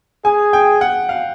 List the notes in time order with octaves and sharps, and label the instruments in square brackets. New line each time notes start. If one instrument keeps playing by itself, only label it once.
[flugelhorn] G#4 [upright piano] G#5
[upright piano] G5
F#5
F5